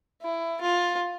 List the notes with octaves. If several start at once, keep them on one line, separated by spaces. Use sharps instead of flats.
E4
F4